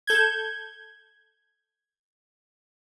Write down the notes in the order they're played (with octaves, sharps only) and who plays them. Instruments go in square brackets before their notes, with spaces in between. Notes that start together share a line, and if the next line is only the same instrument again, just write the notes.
[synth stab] A4 G6 G#6